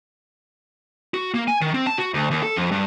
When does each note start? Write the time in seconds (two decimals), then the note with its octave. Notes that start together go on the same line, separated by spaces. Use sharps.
1.14 F#4
1.34 A#3
1.48 G#5
1.61 D#3
1.74 C4
1.87 A5
1.98 F#4
2.14 D2
2.31 D#2
2.43 A4
2.56 F2
2.71 G2